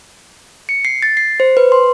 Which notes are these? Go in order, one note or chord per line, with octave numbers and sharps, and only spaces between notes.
C#7
C7
A6
C7
C5
B4
C6